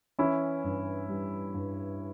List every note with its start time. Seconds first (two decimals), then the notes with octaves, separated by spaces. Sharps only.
0.19 E3 C#4 E4
0.64 G2
1.09 G3
1.54 G2